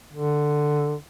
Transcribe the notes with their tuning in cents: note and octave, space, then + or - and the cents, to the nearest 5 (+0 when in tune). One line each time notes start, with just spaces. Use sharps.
D3 +10